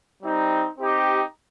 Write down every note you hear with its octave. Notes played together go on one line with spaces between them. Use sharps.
G3 C4 D#4
C4 D#4 G4